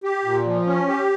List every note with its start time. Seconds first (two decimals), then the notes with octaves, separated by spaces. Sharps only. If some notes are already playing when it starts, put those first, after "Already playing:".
0.04 G4
0.25 A#2
0.46 F3
0.66 C#4
0.87 G4